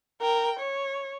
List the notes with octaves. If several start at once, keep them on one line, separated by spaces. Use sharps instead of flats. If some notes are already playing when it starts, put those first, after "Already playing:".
A#4 G5
C#5